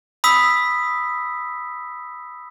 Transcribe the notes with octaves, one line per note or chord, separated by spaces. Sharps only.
B5 D#6 E6 B6